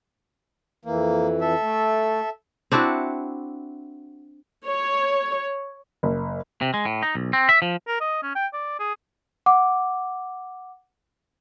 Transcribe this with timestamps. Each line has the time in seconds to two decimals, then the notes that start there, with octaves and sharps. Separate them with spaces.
0.85 F2 E3 A#3
1.41 A4 E5
1.61 A3
2.72 C4 D4 E4 F#4
4.66 C#5
6.03 F#1
6.61 C3
6.74 G#3
6.85 A2
7.03 D#4
7.15 B1
7.33 C4
7.49 E5
7.62 F3
7.88 A#4
8.00 D#5
8.23 C#4
8.35 G5
8.53 D5
8.79 G#4
9.46 F#5 D6